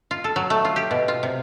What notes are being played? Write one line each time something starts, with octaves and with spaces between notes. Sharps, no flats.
F4
A4
F#3
A3
F4
G4
B2
F4
C3